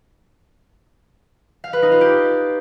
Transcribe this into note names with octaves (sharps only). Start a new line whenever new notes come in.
F5
B4
D#4
F4
G4